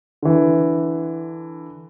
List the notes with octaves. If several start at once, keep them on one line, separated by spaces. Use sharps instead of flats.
D3 E3